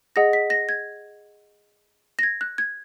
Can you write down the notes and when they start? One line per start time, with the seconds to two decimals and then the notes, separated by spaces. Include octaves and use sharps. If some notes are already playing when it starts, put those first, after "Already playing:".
0.16 G#4 D#5 F#5 A#6
0.33 B6
0.50 A#6
0.69 G#6
2.19 A#6
2.23 G#6
2.41 F#6
2.58 G#6